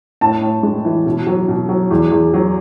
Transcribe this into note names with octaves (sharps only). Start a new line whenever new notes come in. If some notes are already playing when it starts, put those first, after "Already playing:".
A2 A5
A2
G#3
E3
B2
F#3
B2
F#3
E2
E2
F#3